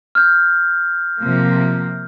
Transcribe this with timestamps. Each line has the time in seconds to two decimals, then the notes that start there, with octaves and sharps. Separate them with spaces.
0.15 F6 G6
1.22 C3 F3 A#3